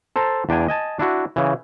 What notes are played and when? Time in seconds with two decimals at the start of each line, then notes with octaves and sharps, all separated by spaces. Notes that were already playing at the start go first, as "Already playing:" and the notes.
0.16 A4 C5 A5 A#5
0.49 E2 D4 G5 G#5
0.68 D#5 G#5 A5
0.99 D4 E4 F#4
1.36 C#3 E3